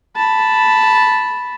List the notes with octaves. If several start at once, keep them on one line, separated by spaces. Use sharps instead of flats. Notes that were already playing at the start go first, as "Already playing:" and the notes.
A5 B5